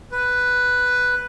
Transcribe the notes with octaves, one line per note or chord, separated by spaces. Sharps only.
B4